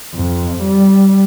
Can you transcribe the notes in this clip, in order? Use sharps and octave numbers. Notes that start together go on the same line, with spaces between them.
F2
G3